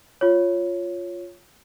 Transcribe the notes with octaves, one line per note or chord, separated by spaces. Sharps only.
F4 C#5